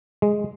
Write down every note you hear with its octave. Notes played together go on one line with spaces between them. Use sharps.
G#3